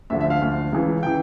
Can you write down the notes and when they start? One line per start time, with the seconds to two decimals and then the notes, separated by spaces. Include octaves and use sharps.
0.10 D2 D3 F3 E5
0.21 E5
0.30 F5
0.42 D2 D3 F3
0.73 C#2 C#3 E3
1.03 C#3 E3 G5